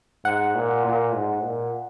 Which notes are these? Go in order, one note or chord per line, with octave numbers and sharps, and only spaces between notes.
G#2 F#5
A#2
A#2
G#2
A#2